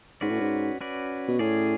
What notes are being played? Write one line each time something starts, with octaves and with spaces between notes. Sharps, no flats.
G#2 C#4 F#4 B4 D5
A2
G#2
C#4 F#4 B4 D5
B2
A2 C#4 G#4 D5